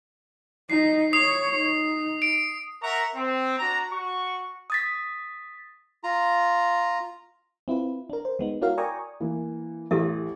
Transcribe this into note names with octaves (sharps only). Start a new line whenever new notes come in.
D#4 D#5 C7
C#5 D#6 C7
D#4
D7
A#4 E5 F#5 A#5 C#6
C4
D4 F#4 A#5
F#4 C#6
D#6 A6 B6
F4 A#5
C4 E4 F4 B4
D4 A#4
C5
G#3 B3 D#4
C#4 E4 F#4 A#4 F5
D5 G5 G#5 A#5 C#6 D#6
E3 A#3
A1 G4 A4 E5